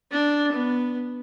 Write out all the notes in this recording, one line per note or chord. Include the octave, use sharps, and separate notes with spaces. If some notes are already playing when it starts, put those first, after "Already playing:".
D4
B3